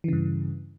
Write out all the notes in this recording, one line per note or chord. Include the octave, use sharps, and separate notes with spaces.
G2 C#3 E3